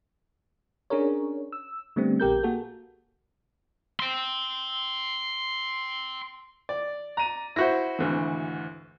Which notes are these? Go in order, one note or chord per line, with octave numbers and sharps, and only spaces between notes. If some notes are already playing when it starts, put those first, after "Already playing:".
C#4 D4 G#4 A#4 C#5
E6
D3 G3 A3 B3 C4
A#1 G4 A#4 G6
A#3 F#4 G#4 A4
G5 C6
D5
A#5 D#7
E4 F#4 C5 A#6
G#1 D2 E3